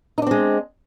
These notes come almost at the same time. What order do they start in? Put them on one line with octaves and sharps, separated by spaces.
D#4 D4 C4 G#3